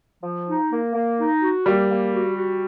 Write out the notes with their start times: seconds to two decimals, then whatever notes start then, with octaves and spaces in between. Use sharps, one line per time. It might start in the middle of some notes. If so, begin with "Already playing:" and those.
0.23 F3
0.48 D#4
0.71 A#3
0.95 A#3
1.19 D#4
1.42 F#4
1.66 G3 A#3
1.90 A#3
2.13 F#4
2.36 F#4